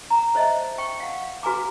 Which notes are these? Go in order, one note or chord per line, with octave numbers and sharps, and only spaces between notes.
A#5
C5 C#5 D#5 E5 A5
G5 C#6
F5 F#5
F#4 B4 G#5 A#5 D6